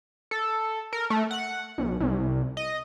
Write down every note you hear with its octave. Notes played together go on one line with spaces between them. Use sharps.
A4
A#4
A3
F#5
B1
C2
D#5